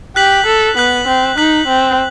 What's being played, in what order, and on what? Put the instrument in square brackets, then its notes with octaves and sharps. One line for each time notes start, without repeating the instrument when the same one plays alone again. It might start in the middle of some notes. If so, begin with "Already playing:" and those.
[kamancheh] G4 [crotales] F#6 B6 F#7
[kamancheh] A4
[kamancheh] B3 [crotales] F#6 B6 F#7
[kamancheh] C4
[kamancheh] D#4 [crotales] F#6 B6 F#7
[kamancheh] C4